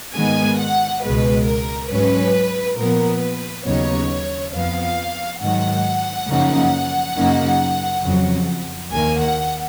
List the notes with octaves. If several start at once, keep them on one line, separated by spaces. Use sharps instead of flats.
G#2 D#3 G#3 B3 G#5
F#5
C#2 B2 G#3 B4
A#4
G#2 F#3 C#4 B4
A#2 F3 B3 A#4
B4
D#2 C#3 F#3 B3 D#4 C#5
F2 F3 B3 F5
G#2 D#3 F#3 F#5
F#2 C#3 F3 A#3 D#4
F#2 C#3 F#3 A#3 D#4
F2 C#3 F#3
D#2 D#3 A#3 G#5
F#5